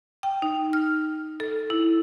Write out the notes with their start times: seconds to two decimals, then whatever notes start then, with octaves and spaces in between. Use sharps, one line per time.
0.23 G5
0.42 D#4
0.73 F6
1.40 A4
1.70 E4